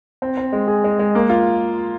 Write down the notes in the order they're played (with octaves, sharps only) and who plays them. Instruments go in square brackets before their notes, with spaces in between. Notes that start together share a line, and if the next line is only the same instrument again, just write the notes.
[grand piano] C4
C4
G#3
G#4
G#3
G#3
A#3
F4